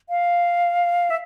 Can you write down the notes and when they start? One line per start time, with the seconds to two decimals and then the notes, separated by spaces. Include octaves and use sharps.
0.09 F5
1.10 E5